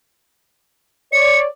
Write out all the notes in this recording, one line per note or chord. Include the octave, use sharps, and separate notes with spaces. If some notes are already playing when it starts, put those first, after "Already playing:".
C#5 D5 C#7